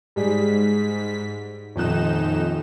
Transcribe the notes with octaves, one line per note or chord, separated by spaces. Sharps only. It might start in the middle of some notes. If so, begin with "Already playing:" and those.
G#2 G3 G#4 B6
D#1 F2 D#4 F#6 E7